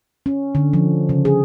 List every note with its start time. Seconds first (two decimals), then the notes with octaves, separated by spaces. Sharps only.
0.26 C#4
0.55 D3
0.73 F3
1.09 C#3
1.25 G#4